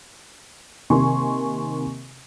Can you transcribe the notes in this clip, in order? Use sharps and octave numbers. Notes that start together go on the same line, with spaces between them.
C3 D#3 A#3 G#5 C6 C#6